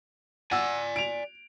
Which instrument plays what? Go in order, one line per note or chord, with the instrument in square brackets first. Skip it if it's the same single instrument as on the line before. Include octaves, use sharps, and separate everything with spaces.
[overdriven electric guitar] D5 G#5 [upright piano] F#5 E6
[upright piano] D7 F7